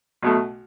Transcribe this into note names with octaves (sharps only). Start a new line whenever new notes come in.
B1 B2 A3